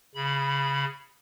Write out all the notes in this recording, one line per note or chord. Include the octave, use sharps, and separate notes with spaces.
C#3 B5